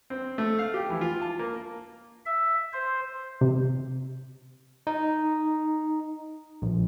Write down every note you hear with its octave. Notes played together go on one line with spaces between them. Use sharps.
C4
A3
F5
G4
E3
F4
A5
A#3
E5
C5
C3
D#4
A#1